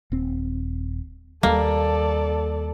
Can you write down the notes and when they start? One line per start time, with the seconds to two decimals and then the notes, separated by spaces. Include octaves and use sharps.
0.12 D#1 C4
1.43 D#2 G3 A#3 A4 D5